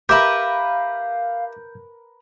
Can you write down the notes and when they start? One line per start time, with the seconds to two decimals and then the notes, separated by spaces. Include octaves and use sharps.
0.09 G4 A#4 B4 E5 F5 G6